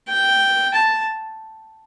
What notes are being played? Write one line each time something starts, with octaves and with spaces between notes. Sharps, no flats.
G5
A5